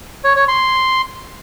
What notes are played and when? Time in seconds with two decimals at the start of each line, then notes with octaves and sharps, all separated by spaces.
0.24 C#5
0.36 C#5
0.48 C6